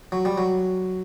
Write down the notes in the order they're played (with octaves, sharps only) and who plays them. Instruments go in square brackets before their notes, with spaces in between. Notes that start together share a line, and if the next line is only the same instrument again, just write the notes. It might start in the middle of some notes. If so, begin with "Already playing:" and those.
[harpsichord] F#3
G3
F#3